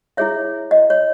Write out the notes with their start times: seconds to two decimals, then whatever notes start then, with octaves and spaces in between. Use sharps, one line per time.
0.17 E4 G#4 C#5 E5
0.71 D#5
0.90 C#5